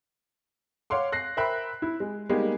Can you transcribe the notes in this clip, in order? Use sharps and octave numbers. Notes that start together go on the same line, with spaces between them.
C#5 F5 F#5 C6 D6
F#6 A#6 C7
A#4 C5 E5 G5 B5 F#6
E4
G#3
G3 G#3 A#3 B3 D#4 G4